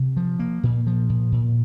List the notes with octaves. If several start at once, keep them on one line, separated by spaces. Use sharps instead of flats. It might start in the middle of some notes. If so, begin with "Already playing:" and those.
Already playing: C3
F3
A#3
A#2
F3
A#2
A#2